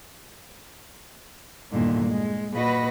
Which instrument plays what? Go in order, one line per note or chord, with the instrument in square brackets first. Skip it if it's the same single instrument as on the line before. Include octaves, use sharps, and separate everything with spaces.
[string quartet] E2 G2 A#2 D3 D#3
G#3
A#2 F#4 B4 D#5 B5